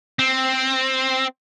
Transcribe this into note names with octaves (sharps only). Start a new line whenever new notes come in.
C4